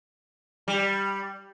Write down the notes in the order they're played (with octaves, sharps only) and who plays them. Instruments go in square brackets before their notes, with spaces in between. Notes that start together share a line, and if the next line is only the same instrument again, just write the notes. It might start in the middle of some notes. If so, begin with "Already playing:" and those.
[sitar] G3